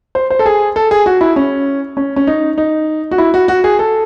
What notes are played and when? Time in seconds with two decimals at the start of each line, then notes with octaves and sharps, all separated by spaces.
0.15 C5
0.30 C5
0.39 A4
0.46 G#4
0.76 A4
0.91 G#4
1.06 F#4
1.21 E4
1.36 C#4
1.97 C#4
2.16 C#4
2.27 D#4
2.58 D#4
3.11 F#4
3.18 E4
3.34 F#4
3.48 F#4
3.64 G#4
3.79 A4